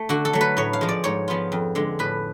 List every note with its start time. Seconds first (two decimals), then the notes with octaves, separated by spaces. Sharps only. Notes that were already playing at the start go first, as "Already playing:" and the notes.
Already playing: A3
0.09 D3 F#4
0.25 A4
0.33 F#3 A3
0.41 B4
0.57 A2 C#5
0.73 F5
0.81 F3 G#3
0.89 D5
1.04 G#2 C#5
1.28 F3 B3 F4
1.52 F2
1.75 D3 G#3
1.99 A2 B4